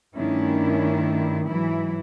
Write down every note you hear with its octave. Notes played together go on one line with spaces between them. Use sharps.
G2 D#3 A3 C#4 D4 E4
G#2 E3 F#3 E4